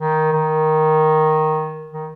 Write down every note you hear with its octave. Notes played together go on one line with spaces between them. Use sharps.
D#3
D#3
D#3